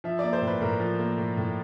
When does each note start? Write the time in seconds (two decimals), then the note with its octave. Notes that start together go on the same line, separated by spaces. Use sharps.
0.04 F3 E5
0.19 A#3 D5
0.33 C5
0.42 A2
0.47 B4
0.61 A2 A#4
0.80 F3
0.99 A#3
1.18 A2
1.37 A2